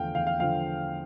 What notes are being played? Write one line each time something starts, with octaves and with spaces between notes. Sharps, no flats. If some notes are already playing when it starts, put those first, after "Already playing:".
Already playing: E2 D3 F3 A3 F5 G5
E2 F5
F5
D3 F3 A3 F5